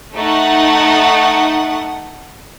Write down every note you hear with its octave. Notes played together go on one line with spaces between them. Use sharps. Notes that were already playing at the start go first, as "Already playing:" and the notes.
A3 D#4 F#5